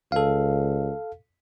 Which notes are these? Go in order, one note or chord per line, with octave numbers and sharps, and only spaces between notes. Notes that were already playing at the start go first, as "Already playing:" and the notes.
C#2 A4 F5